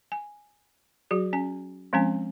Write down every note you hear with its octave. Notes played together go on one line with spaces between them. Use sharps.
G#5
F#3 F#4 G#4
C#4 G#5
F3 G#3 C4 C#4 G#5